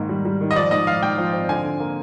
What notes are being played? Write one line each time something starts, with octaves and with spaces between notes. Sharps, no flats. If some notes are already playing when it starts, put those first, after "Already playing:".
Already playing: G#2 D#3 A#3
G3
G3
D#3
D#5
F3 D5
G#2 D#5
F3 F5
G#2 G5
F3
C4
D3 G#5
D3
A#3